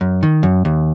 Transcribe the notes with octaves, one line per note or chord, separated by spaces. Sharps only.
F#2
D#3
F#2
D#2